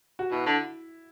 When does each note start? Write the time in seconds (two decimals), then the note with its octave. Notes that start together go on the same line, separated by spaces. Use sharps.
0.19 F#4
0.31 B2 E4
0.46 D3